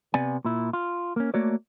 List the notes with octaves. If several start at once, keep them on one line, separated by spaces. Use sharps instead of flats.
C3 B3 D5 G#5
A#2 E4
F4
A#3 C#4
A3 A#3 F#4 C#5 D5